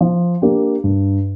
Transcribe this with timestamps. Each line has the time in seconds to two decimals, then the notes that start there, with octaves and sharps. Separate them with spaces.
0.01 F3
0.42 A#3 D4 G4
0.84 G2